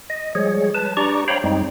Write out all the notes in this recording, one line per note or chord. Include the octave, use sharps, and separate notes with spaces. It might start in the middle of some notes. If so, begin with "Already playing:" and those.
D#5
F3 G3 G#3 G#4 C#5
B4 A5
D4 G4 D5 A#5 C#6
C5 C#5 F5 G5 A#5 B5
F#2 G3 G#3 C4 D#4